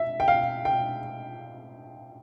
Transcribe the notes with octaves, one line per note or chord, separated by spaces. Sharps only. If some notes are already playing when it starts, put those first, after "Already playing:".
Already playing: E5
G5
F5
G5